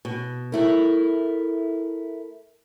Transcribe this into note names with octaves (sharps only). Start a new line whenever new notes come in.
B2
A3 E4 A#4